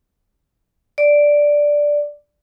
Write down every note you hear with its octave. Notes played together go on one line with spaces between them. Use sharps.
D5